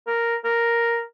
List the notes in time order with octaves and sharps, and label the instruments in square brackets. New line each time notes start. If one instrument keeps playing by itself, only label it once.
[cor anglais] A#4
A#4